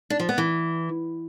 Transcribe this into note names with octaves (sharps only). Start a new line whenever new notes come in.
D4
F3
B3
E3